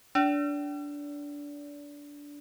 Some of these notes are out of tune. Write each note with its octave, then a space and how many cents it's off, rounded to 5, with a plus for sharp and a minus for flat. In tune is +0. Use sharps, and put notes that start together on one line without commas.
D4 -15 D5 -30